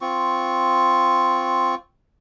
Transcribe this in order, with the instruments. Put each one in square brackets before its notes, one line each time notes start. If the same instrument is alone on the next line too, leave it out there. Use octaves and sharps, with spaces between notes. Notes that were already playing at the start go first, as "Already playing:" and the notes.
[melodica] C4 F4 C#6